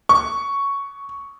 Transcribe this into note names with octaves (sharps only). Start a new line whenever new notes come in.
C#6